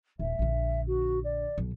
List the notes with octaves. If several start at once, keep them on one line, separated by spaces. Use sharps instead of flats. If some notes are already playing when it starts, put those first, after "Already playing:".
D#1 E5
A#1 D3
F#4
D5
B1